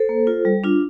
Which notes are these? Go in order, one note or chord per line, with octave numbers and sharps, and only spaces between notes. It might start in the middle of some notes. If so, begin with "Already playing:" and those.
Already playing: A4 C5
A#3
F4
G3
D4 F4